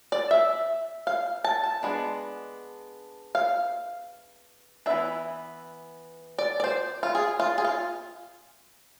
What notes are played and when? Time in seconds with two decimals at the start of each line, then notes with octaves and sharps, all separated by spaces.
0.12 D5
0.31 E5
1.07 F5
1.44 A5
1.64 A5
1.83 G#3 B3 D4
3.35 F5
4.86 E3 B3 D4 E5
6.39 D5
6.60 D5
6.64 C5
7.03 F4
7.15 G#4
7.40 F4
7.58 G#4
7.65 F4